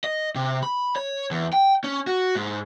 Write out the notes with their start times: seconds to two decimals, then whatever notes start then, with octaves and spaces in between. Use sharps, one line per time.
0.04 D#5
0.35 C3
0.63 B5
0.96 C#5
1.31 E2
1.53 G5
1.84 C#4
2.07 F#4
2.35 G#2